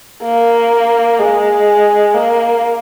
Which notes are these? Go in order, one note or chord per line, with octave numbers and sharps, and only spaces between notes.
A#3
G#3
A#3